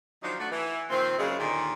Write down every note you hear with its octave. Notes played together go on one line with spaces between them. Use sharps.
D#3 F3 F#3 D4 D#4 F4
A3 D4 F#4
E3
A#2 D#3 F3 C4
F#2 C#3 G#3
D#2 A#2 D3 D#3